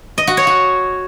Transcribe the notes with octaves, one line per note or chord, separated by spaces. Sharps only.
D#5
F#4
C#5
F#4